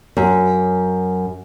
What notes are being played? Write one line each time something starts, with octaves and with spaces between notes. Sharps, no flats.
F#2